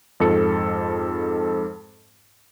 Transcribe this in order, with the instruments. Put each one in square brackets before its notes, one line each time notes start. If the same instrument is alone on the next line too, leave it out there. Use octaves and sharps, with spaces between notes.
[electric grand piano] F2 G#2 A4 C#7